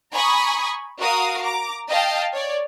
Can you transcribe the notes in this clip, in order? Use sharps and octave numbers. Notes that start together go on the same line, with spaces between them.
G#5 A#5 B5 C#6 D#6
F#4 A#4 F5 D#6
A#5 D6
D#5 F5 G5 A5
C#5 D5